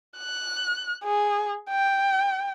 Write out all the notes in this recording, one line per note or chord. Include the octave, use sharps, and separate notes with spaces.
F#6
G#4
G5